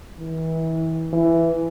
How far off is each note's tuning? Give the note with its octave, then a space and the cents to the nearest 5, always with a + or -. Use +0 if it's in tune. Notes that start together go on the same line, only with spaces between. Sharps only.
E3 -30
E3 +10